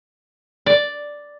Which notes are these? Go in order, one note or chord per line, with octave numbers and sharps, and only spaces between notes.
D5